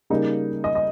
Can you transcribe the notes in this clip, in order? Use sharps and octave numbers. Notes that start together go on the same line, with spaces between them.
C#3 G3 A#3 D#4
D#5
D#5